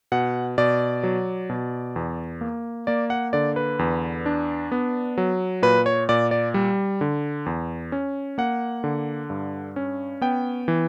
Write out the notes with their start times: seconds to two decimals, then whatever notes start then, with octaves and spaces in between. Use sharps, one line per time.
0.12 B2 F#5
0.58 B2 D5
1.03 F#3
1.50 B2
1.96 E2
2.41 A#3
2.87 A#3 D5
3.10 F#5
3.33 D3 D5
3.56 B4
3.79 E2
4.26 D4
4.72 B3
5.18 F#3
5.62 A#2 B4
5.86 C#5
6.09 A#2 D5
6.31 D5
6.54 G3
7.01 D3
7.46 E2
7.92 C#4
8.38 A#3 F#5
8.84 D3
9.30 G2
9.76 C#4
10.21 B3 G5
10.68 E3